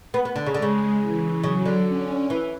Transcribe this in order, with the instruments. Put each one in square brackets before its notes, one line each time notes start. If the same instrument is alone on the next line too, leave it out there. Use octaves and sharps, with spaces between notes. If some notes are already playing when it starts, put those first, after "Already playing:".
[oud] B3
B3
D3
C#3
[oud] D3 [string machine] G#3
[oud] C#3
[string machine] E3
[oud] C#3 [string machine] F#3
[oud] D3
[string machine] C#4
[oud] E3